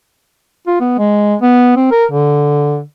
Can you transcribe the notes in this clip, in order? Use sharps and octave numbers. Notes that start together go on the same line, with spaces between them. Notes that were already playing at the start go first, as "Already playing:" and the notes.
F4
B3
G#3
B3
C4
A#4
D3